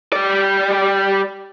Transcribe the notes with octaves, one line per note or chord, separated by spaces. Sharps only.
G3 D5